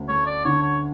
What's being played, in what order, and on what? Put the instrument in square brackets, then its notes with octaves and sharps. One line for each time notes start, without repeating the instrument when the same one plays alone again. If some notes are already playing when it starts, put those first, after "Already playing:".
Already playing: [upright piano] D2 C#4
[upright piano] A3 [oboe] C#5
[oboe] D5
[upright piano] D3 [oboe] C#5
[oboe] C#5